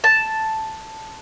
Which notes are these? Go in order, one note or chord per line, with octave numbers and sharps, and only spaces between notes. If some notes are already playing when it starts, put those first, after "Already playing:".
A5